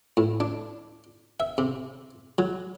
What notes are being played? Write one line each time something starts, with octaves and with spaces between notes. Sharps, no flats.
A2
D4
E5
C3
F#3